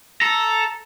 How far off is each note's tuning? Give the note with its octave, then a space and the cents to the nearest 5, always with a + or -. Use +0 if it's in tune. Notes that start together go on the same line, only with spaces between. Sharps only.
A4 +0 A#5 +0